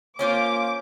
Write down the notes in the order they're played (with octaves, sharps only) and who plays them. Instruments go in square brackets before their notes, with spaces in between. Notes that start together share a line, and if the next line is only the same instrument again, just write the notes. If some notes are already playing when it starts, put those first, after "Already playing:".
[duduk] A#3 [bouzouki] C#4 F4 C5 [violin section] D6